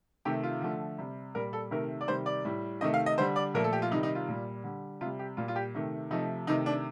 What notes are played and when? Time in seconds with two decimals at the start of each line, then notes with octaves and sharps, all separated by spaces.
0.25 C3 D#3 A3 G4
0.43 F4
0.62 D3 F3 A3
0.99 C3 G3
1.35 A#2 G3 A#4
1.53 A4
1.71 C3 D#3 A3 A#4
2.01 D5
2.08 C3 D#3 G3 C5
2.26 D5
2.45 A2 G3
2.81 C3 D#3 A3 D#5
2.94 F5
3.06 D#5
3.18 D3 G3 C5
3.36 D5
3.54 A#2 F3 A3 A#4
3.64 A4
3.73 G4
3.82 F4
3.91 C3 D#3 G3 D#4
4.03 D#4
4.15 F4
4.28 A#2 G3
4.64 D3 G3
5.01 C3 G3 F4
5.19 G4
5.37 A#2 G3 F4
5.48 F4
5.56 G4
5.75 C3 D#3 A3
6.11 C3 F3 A3 D#4
6.47 C3 D#3 A3 D#4
6.66 D4